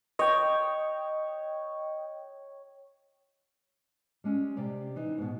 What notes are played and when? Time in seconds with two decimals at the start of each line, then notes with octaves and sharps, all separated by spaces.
0.19 C#5 D#5 G5
4.24 G3 G#3 C#4
4.57 C3 G4 D5
4.96 E3 D#4
5.18 G#2 B2